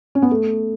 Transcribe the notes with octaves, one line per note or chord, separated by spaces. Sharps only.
C#4
B3
A3